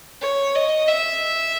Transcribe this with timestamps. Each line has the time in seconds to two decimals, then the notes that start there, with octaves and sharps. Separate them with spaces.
0.22 C#5
0.55 D#5
0.88 E5